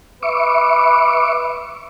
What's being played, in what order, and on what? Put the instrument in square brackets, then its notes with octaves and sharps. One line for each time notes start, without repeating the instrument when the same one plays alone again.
[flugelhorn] B4 [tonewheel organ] E5 C#6 D6